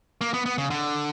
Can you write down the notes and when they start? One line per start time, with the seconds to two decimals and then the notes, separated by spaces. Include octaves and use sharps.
0.21 A#3
0.34 B3
0.46 B3
0.58 C#3
0.70 D3